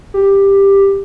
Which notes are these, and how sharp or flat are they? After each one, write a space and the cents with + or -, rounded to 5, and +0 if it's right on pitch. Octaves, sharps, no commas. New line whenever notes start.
G4 +10